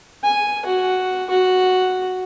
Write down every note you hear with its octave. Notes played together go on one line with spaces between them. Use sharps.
G#5
F#4
F#4